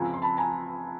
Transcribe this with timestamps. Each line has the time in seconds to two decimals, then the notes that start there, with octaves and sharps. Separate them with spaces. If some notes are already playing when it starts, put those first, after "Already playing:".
Already playing: C#2 C3 F3 G#5 A#5
0.14 C6
0.22 A5 B5
0.37 G#5 A#5